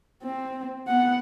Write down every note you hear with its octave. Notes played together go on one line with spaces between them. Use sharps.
C4
B3 F#5